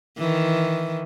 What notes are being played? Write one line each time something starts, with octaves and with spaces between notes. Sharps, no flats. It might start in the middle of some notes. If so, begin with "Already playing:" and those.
D#3 E3